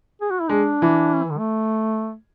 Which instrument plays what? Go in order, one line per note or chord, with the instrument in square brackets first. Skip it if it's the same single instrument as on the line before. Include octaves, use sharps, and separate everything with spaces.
[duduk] G#4
F#4
E4
[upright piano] G#3 [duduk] D4
[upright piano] E3
[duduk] C#4
E3
D3
A3